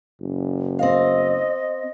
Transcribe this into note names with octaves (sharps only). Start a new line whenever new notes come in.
F#1
C4 D#5 F5